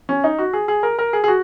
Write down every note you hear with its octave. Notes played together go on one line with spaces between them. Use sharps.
C#4
D#4
F#4
G#4
G#4
A#4
A#4
G#4
G#4
F#4